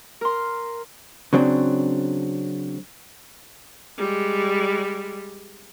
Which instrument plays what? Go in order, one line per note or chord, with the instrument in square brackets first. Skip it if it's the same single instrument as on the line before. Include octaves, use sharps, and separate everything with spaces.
[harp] A#4 C6
[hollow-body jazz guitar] C#3 F#3 C4 D4
[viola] G3 G#3